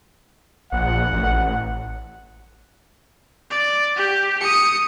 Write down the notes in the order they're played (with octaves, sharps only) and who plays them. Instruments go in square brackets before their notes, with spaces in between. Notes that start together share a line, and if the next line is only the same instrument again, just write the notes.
[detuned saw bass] A#1 [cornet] F#5
[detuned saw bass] A1
[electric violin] D5
G4
D#6 C#7